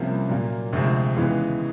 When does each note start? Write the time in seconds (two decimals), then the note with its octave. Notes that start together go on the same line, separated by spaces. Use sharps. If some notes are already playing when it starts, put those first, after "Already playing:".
Already playing: C2 C3 F3 A#3 C#4
0.29 A#2 F#3 A#3
0.73 D2 C3 F3 G#3 C4
1.16 D#2 C#3 E3 G#3 B3